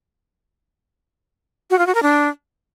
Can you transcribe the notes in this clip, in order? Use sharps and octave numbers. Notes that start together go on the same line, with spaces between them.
F#4
F4
F#4
A#4
D4